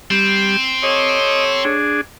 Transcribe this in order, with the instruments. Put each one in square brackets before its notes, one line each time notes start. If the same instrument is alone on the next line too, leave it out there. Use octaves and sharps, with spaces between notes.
[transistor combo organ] G3 [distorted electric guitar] C4
[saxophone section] G4 A4 C#5 [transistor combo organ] D#5
[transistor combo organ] D4 G#4